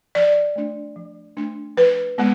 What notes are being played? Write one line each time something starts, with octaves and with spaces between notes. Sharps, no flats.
F3 D5
A3 D4
F3
A3 D4
F3 B4
G#3 B3